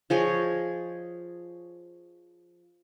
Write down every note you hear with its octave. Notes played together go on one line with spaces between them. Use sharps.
F3 G#4 C#5 D#5